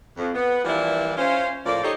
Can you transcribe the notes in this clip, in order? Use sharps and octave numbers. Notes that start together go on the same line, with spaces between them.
F2
B3
E3 F3 G3 A#3 D4 E4
C#4 F4 C5
A2 F3 A#3 D5
D#4 G4 A4 C5 C#5 D#5